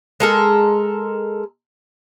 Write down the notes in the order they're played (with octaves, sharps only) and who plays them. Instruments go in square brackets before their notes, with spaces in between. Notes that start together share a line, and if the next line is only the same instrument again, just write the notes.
[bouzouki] G#3 A4 A#4